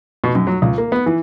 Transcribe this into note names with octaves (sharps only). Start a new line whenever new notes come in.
B2
F#2
F#3
C#2
A#3
B3
E3